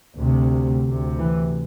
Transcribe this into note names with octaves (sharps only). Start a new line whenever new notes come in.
D2 C3
D2 C3
E3